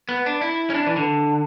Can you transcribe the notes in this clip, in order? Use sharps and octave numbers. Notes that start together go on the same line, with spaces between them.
B3
D4
E4
C#4
D4
E3
D3